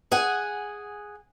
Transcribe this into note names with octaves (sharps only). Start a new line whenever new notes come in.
G#4 F#5 G#5